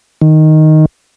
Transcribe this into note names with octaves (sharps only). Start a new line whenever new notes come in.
D#3